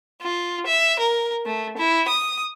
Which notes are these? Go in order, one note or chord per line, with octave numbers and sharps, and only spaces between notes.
F4
E5
A#4
A3
E4
D#6